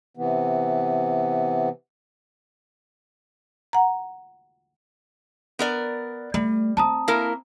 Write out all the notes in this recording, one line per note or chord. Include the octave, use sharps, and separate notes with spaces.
C3 E3 B3
F#5 A#5
B3 A#4 D5
G3 A3
C4 A5 A#5 D#6
A#3 E4 A#4